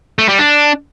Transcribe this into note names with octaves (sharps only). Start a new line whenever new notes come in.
A3
G3
D4